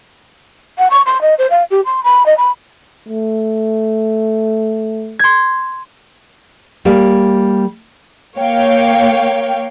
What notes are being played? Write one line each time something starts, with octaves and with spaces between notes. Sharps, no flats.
F#5
C#6
C6
D#5
C5
F5
G4
C6
B5
D#5
B5
A3
C6 G#6
G3 A#3
A#3 C#5 F5 G5